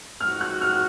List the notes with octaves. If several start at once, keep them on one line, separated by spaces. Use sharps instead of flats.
G#2 F3 G#3 C4 F#4 F6
F#6
F6
F6